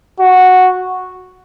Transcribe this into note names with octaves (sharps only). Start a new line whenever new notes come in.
F#4